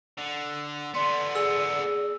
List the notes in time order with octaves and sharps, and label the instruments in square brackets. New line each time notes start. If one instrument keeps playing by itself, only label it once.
[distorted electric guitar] D3
[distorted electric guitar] D3 B3 [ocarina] D5 [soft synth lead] C6
[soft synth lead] G#4 [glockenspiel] E6